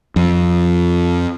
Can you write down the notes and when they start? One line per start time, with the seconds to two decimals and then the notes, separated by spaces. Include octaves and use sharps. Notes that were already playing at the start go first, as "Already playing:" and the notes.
0.16 F2